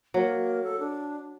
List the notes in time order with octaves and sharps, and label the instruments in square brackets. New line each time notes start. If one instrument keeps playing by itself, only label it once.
[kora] F#3 [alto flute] A#3
[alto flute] A4
D4